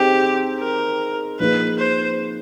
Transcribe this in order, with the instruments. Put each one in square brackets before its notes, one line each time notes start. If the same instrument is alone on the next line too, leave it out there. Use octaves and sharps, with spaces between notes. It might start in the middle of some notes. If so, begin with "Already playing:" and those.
Already playing: [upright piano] C4 D#4 G#4 [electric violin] G4
[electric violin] A#4
[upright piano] F3 A#3 D#4 G#4 [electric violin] B4
[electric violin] C5